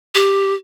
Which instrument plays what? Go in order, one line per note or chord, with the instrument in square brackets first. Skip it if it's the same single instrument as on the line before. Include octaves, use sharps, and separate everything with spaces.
[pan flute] G4